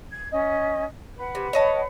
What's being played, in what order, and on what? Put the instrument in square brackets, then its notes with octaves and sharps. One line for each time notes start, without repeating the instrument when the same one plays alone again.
[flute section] G#6
C#4 D#5
B4 F#5
[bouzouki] C3
C#5 D#5 A5